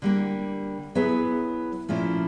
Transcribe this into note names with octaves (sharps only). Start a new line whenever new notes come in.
D3 G3 A#3
F#3 B3 E4 G#4 B4
A#2 F3 A3 C#4 E4